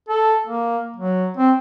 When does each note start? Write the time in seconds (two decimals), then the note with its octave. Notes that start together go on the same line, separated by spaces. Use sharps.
0.09 A4
0.47 A#3
0.96 F#3
1.37 C4